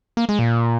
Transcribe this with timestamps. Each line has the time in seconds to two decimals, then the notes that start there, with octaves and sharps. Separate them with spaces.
0.17 A#3
0.29 G#3
0.39 A#2